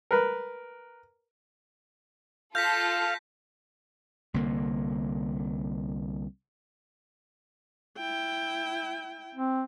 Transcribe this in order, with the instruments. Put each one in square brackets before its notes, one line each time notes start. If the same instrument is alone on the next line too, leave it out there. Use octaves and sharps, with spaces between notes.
[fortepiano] A#4 B4
[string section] F4 A4 [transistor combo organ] F5 [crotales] G6 A#6 B6
[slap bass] C2 D3 A#3
[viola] E4 G5
[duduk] C4